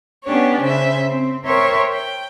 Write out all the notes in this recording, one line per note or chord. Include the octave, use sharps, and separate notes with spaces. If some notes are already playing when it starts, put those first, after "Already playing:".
B3 C#4 D4 G4 C#5
C#3 C5 E5
C4
A#4 C5 C#5 E5 G5 C#6
G5